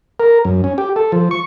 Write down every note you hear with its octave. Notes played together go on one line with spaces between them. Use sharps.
A#4
F#2
C#4
G4
A4
F3
C#6